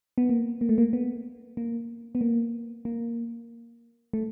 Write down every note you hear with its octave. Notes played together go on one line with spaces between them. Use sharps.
B3
A#3
A#3
A3
A#3
B3
A#3
B3
A#3
A#3
A3